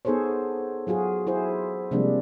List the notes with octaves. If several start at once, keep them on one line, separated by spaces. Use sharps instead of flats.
B3 D#4 G#4 A4 C5 C#5
F#3 F4 F#4 G#4
E4 G#4 C5
C3 F3 G3 G#3 A#3 D4